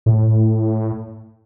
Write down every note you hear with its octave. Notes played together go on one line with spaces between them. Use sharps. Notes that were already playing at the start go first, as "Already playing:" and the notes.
A2